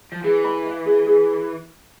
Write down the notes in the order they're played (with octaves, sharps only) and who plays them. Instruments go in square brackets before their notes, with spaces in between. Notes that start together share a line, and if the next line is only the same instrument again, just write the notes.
[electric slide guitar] F3
[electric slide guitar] E3 [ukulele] G#4
[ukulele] B5
F5
G#4
G#4